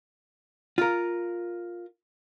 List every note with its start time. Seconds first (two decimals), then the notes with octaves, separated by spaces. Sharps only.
0.78 F4 A#4